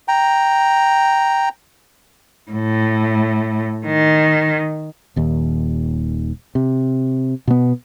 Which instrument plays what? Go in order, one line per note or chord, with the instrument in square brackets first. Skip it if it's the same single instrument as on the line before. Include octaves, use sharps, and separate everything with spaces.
[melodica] G5 A#5
[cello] A2
D#3
[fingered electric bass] D#1 D#2
C3
B2 B3